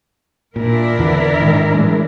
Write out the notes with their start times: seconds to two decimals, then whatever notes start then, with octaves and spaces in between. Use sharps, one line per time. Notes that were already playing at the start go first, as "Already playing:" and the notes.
0.56 A#2 D4 E4 A#4
0.99 E2 D3 E3
1.39 G#2 D#3
1.74 A2 E3 G#3